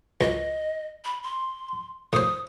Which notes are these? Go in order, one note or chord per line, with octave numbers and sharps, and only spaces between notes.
C#2 D#5
B5
C6
A2 C5 D#6